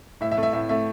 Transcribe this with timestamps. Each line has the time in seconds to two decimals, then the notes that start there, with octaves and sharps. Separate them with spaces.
0.21 A2 E5
0.32 E5
0.38 A3
0.43 E5
0.53 A2 E5
0.69 A3 E5